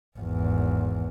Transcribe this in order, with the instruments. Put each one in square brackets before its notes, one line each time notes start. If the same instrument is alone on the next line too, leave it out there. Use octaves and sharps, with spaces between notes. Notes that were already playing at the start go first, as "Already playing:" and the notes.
[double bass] G#1 E2